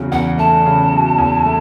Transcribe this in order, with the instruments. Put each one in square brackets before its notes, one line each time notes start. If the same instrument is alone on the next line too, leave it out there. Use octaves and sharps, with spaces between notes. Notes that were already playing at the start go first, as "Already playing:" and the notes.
Already playing: [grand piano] E2 C#3 F#3 A3
[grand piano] E2 [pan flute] F#5
[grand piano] A3 [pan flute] A5
[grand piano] C#3
F#3
E2
A3